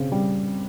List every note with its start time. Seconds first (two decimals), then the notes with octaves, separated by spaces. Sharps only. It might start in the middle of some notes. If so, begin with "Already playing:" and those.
Already playing: C#3 C4
0.12 G3